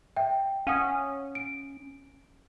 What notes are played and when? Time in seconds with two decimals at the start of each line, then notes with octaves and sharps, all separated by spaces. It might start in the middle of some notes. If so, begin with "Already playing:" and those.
0.17 E5 G5
0.67 C#4 F5 F#5 D#6
1.35 D7